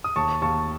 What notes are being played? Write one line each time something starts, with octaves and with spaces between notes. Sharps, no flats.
D#6
D#2 A5 C#6
D#2 A5 C#6